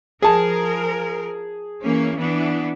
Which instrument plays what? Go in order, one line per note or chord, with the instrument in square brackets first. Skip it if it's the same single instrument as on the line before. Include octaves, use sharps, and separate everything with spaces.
[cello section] F3 A#4 [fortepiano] G#4 A5
[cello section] E3 A#3 C#4
E3 B3 D4